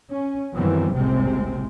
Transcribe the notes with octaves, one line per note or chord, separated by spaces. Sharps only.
C#4
F#2 D#3 E3 G3 B3 C4
F#1 C2 A2 C3 G#3 C4